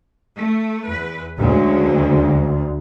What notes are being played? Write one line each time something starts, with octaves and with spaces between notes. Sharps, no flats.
A3
E2 B4
D2 C#3 F#3 G#3